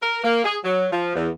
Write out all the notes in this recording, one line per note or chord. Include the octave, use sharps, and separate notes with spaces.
A#4
A#3
G#4
F#3
F3
E2